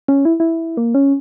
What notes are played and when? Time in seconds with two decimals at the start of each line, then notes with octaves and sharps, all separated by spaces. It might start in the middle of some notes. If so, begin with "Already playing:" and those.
0.08 C#4
0.25 E4
0.40 E4
0.77 A#3
0.95 C#4